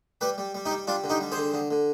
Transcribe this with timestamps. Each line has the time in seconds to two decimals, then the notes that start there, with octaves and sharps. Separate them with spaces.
0.21 G3 G4 B4
0.38 G3
0.55 G3
0.65 D#4 G4
0.71 G3
0.87 G3 D4 F4
1.04 D3
1.10 D#4 G4
1.21 G3
1.32 G#4 C5
1.37 D3
1.54 D3
1.71 D3